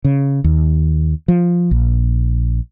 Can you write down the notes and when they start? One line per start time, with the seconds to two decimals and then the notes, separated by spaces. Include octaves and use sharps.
0.04 C#3
0.44 D#2
1.28 F3
1.71 A#1